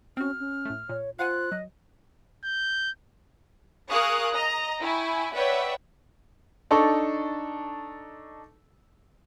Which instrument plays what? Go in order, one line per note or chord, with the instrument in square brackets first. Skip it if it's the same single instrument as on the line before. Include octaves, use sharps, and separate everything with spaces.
[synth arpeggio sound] C4 F#4 [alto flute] C#4 [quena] F6
[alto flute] C#4
[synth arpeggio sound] A2 A3
[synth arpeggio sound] A#2 [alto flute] C#5
[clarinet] F4 [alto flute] C5 [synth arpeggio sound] F5 F#5 G#5 [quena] F#6
[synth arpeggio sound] F#3 [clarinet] D#5
[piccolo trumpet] G6
[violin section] G#4 A#4 F5 C#6 D#6 F#6
D#5 A#5
E4 G5 G#5 C#6
B4 C#5 D5 E5 F#5 G5
[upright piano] D4 D#4 A4 C#6